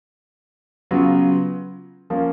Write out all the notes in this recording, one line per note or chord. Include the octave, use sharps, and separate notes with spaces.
C#3 F#3 B3 F4
F3 A#3 C#4